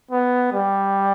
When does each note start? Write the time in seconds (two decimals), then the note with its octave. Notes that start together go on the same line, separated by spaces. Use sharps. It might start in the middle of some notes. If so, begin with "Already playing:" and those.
0.11 B3
0.53 G3